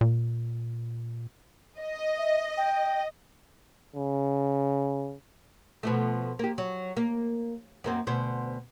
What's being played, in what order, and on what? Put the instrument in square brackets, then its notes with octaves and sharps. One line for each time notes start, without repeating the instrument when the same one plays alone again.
[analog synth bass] A#2
[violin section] D#5
[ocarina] E5
G5
[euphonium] C#3
[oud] B2 F3 A3
A#3 G4
F#3
A#3
F#2 A#3 C4
D2 B2 C4